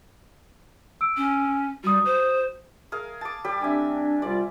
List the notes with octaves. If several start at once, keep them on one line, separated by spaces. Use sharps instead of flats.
E6 D7
C#4
G3 F#4 D#6
C5
G#4 A#4 F5
A5 D6
G3 G4 A4
G3 C4 D4 E5 G#5
C2 G3 F4 D5